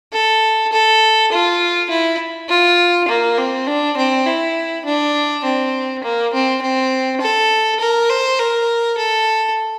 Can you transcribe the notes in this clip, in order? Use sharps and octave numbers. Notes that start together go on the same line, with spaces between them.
A4
A4
F4
E4
F4
A#3
C4
D4
C4
E4
D4
C4
A#3
C4
C4
A4
A#4
C5
A#4
A4